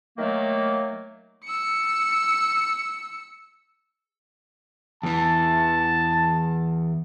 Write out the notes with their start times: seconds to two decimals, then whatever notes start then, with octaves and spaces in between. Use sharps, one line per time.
0.18 D#3 F#3 A3 A#3
1.45 E6 C#7
5.03 E2 E3 A5